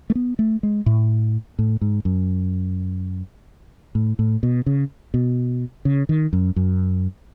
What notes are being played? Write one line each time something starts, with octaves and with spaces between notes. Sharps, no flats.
A3
B3
A3
G#3
A2
A2
G#2
F#2
A2
A2
B2
C#3
B2
C#3
D#3
F#2
F#2